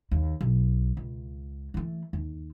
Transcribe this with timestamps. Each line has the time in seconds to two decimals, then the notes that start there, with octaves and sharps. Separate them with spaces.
0.11 D#2
0.41 B1
0.97 C#2
1.74 E3 A3
2.13 D#2